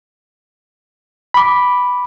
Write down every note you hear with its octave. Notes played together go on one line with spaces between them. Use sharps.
B5 D6